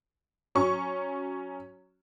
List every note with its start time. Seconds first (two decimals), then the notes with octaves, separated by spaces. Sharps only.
0.55 F#3 C#4 C#6